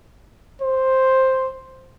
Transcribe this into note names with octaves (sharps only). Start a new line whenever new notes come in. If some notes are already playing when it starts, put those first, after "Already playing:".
C5